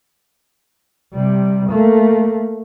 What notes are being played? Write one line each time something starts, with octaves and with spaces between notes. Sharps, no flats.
C3 G3
A3 A#3